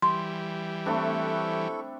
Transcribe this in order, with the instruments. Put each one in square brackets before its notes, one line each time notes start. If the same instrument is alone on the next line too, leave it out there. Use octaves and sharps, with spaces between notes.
[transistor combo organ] E3 G3 [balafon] C6
[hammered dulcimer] A3 C4 D4 [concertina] E4 A4 C#6